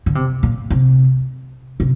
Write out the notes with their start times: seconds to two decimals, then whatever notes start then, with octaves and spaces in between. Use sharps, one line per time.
0.06 D3
0.15 C3
0.43 A#2
0.70 C3
1.80 C3